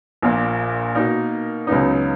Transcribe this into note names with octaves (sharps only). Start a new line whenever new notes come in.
A#1 A#2 A#3
B2 A#3 D#4 A#4
C#2 C#3 F#3 B3 D#4